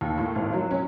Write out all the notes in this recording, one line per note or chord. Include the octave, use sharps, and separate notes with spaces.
D#2
A2
G#1
F#3
C#4